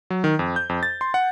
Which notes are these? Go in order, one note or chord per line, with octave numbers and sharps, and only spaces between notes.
F#3
D#3
F2
G6
F2
A6
C6
F#5